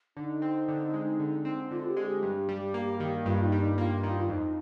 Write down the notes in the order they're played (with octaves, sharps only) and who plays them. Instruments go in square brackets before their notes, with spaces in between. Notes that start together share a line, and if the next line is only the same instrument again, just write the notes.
[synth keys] D3 [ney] D#4
[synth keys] C4
D3
G#3
D3
C4
[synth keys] D3 [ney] F4
[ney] G4
[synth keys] G#3
[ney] G4
[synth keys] G2
G3
A#3
D#3
[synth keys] G2 [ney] F4
[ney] D#4
[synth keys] G3
[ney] D#4
[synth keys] A#3 [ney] F4
[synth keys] D#3
[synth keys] F2 [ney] D#4